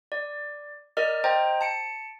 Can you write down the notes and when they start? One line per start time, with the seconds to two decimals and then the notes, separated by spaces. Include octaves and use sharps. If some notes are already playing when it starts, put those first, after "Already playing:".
0.12 D5
0.97 A#4 D5 D#5 F6
1.24 C5 D#5 G5 A#5
1.61 A5 C#7 D7